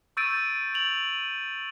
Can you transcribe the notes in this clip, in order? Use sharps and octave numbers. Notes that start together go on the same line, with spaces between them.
C#6 E6 G6 A6 D7 D#7
F7 F#7